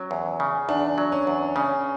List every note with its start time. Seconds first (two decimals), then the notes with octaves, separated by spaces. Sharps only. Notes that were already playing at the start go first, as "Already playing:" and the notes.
Already playing: F#3 C#4
0.11 E2
0.40 C#3
0.69 E2 D4
0.98 F#3
1.12 C#4
1.27 E2
1.56 C#3 C#4